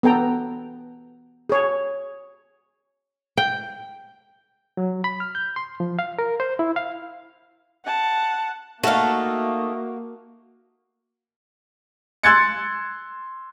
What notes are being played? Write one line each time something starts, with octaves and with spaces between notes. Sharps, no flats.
B3 A4 G5 A#5
G#4 C#5
G5
F#3
B5
F6
G6
C6
F3
F5
A#4
C5
E4
F5
F#5 A5
A3 A#3 D#4 F#4 A4 F5
C6 E6 F#6 G#6 A6 C#7